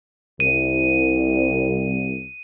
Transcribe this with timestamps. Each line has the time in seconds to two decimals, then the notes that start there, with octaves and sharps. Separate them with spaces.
0.40 C2 D#7